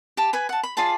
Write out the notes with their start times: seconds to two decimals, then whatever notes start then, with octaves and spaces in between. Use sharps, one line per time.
0.17 G4 A5
0.33 B4 G#5 B5
0.49 F#5 A5
0.63 B5
0.77 F4 G#4 D5 A5